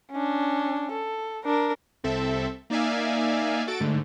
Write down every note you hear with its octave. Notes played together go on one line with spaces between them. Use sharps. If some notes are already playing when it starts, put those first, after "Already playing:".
C#4 D4
A4
D4 A#4
C2 C4 A4 E5
A#3 D#4 D5 E5 F5 G#5
F#4 A4 A6 D7
G#2 D3 A3